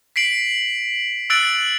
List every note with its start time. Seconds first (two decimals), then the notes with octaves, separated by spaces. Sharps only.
0.16 B6 C7 D7 F#7
1.30 E6 F#6 A6 D7 F#7